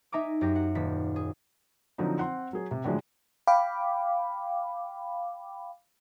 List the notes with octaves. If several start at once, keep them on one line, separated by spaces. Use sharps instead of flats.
D#4 E5 G#5 A#5 D6
F#2 G4 A#6
F#5
D#1 B6
G#4
D3 F3 F#3 C4 D#4
C4 F#5 C6
F#3 G#4
C3
A2 D3 F3 F#3 G#3
F5 G5 B5 D6